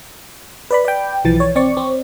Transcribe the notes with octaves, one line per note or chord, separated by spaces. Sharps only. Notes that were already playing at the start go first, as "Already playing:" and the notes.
B4 D5 B5
D5 G5
B1 E3 F3 A6
C#5
C4 D5 C#6
C4